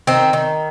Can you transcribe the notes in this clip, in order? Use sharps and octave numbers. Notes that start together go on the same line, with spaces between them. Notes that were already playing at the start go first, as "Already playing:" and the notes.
D#3 C4
D#3